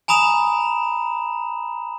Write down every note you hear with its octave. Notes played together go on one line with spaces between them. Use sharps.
G#5 A#5 B5 D#6 E7 F7